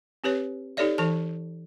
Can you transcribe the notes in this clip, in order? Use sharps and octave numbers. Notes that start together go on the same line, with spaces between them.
C4 G4 B4 C#5
D#4 G4 A4 C#5 D5 E5
E3 D#4 A4 A5